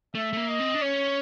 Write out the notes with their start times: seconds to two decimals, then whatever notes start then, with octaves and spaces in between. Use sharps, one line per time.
0.15 A3 E5
0.33 A3
0.37 A#3
0.49 D#5
0.60 C4
0.74 D4
0.82 C#4 C#5